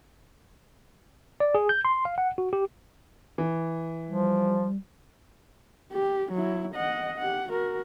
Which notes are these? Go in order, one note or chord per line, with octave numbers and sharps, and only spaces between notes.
D5
G#4
G6
C6
F5
F#5
F#4
G4
E3
F3 G3
G4
F#3 E4
D#5 F#5
G4 F#5
F#4 A#4